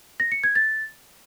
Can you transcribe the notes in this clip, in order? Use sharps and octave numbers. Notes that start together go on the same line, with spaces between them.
A#6
C#7
G#6
A6